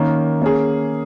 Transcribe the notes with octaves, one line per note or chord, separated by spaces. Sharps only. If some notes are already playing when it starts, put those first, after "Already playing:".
Already playing: D#3 A#3 C#4
A#3 C#4 G#4